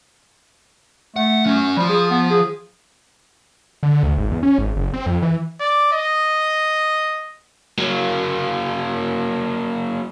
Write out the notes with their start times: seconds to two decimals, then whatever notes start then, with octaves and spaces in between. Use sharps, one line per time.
1.16 A3 F#5
1.46 C#4 F#4
1.77 F3 G3 F4
1.89 G#4
2.10 B3
2.30 G#4
3.83 D3
4.03 D2
4.18 G#1
4.31 E2
4.43 C#4
4.58 G#1
4.76 F#1
4.94 C4
5.06 F2
5.22 E3
5.60 D5
5.93 D#5
7.78 F#3 A#3